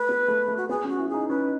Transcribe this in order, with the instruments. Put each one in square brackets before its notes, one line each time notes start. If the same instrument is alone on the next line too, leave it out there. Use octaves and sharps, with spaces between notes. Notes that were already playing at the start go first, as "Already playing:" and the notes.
Already playing: [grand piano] A3 [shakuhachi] B4
[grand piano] B3
A3
A3
[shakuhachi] F#4
[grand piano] B3 [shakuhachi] G#4
[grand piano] C#4
[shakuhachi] F#4
[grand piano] E4
[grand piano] D#4 [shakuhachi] G#4
[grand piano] C#4 [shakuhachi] B4